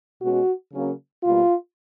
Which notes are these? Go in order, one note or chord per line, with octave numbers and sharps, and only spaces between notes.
B2 G#3 C#4 F#4
C#3 F#3 A#3 C#4
B2 G3 A#3 F4